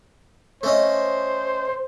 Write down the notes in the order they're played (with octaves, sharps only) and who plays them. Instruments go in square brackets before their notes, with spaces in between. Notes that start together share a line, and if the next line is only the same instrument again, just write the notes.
[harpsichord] A3 C#4 D#5 [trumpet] C5